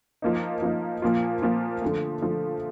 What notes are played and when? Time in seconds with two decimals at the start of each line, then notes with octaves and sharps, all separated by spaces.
0.22 F3 A#3 D#4
0.62 F3 A#3 D#4
1.02 A#2 F3 A#3 F4
1.42 A#2 F3 A#3 F4
1.82 D3 F3 A3
2.22 D3 F3 A3